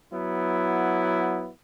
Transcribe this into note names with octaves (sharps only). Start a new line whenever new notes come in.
F#3 B3 E4